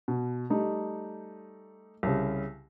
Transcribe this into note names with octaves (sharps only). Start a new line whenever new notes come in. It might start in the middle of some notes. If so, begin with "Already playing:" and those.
B2
G3 A3 D#4
C2 C#3